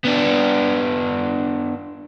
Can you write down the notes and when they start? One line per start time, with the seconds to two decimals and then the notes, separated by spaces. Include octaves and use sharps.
0.04 B3 D4